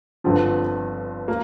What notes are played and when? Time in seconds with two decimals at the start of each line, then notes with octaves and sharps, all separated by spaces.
0.24 G1 G2 D3 F3 C4
1.28 A#3